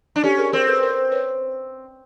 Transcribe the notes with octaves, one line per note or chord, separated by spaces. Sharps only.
D4
C#4 G4 A4
G#4 A#4
C4 G#4 A#4
A4 B4
B4
A#4 C5
B4 C#5